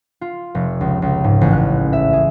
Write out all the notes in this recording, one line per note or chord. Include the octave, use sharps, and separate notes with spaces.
F4
F1
C#2
C#2
G#2
A1
F#6
E5
G#4